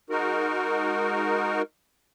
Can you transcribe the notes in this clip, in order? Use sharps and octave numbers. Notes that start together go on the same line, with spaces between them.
G#3 D#4 F#4 A#4